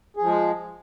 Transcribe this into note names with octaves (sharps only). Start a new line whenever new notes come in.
F3 G#3 G#4